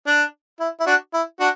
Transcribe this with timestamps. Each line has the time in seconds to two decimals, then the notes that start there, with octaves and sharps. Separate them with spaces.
0.07 D4
0.60 E4
0.80 E4
0.87 D4 F#4
1.14 E4
1.40 D4 F#4